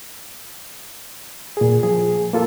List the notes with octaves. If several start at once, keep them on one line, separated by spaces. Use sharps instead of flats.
A#2 G#4
F3 G#4
A#3 F4 A4